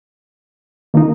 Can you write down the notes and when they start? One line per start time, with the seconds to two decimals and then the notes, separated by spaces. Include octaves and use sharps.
0.94 D#3 A#3 D#4